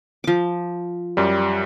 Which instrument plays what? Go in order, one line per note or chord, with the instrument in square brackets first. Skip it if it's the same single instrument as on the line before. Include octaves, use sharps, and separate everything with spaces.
[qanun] F3 D6
[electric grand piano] F#2 G3